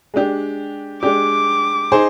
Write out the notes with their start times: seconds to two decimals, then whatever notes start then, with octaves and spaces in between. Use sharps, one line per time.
0.14 G#3 D4 G4
1.02 G#3 D4 G4 D6
1.92 D#4 G#4 C5